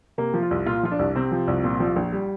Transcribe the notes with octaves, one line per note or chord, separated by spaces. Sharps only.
C3 A#3
F3
F4
C2
A#2 F4
F3 F4
D4
C2
C3 C4
F3
C2
A#2
F3
A#1
G3